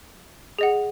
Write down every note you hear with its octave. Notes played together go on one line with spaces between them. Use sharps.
G#4 D#5 F#5